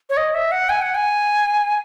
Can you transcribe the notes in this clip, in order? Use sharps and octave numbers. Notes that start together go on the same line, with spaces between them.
C#5
D#5
E5
F#5
G#5
F#5
G#5